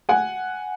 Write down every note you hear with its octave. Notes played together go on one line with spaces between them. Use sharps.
F#5 G#5